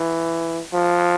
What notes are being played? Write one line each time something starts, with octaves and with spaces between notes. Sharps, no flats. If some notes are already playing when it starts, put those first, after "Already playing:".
Already playing: E3
F3